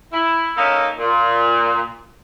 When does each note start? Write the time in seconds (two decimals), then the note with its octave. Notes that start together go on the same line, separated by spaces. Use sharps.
0.11 E4
0.56 A#3 C#4 D#4 A4
0.98 A#2